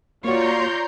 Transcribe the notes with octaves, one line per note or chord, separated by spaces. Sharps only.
A#3 F4 F#4 C#5 D5 A#5 C6 G6